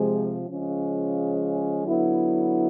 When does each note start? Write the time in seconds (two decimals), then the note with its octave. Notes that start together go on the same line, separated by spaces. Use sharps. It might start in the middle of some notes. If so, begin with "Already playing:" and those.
Already playing: C3 F3 G#3
0.48 C#3 F3 G#3 C#4
1.84 D3 F#3 B3 E4